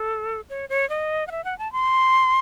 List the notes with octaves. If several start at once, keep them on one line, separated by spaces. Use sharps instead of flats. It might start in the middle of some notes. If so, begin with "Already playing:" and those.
Already playing: A4
C#5
C#5
D#5
F#5
E5
F#5
A5
C6